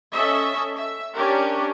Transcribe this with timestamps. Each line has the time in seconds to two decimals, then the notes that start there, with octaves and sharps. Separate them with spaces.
0.13 C#4 A4 D#5 E5
0.75 E5
1.15 C#4 D4 G4 A#4